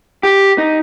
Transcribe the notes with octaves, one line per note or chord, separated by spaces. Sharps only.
G4
D#4